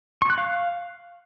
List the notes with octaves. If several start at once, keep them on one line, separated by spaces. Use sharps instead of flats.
C#6
F#6
F5